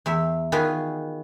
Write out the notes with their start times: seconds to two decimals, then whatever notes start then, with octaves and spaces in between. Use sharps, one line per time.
0.06 E2 E5
0.52 D#3 F4 F#4 G#4 B4